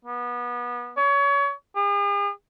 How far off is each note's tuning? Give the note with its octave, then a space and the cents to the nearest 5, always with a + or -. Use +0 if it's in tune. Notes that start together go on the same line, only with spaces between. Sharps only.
B3 -25
C#5 +30
G#4 -45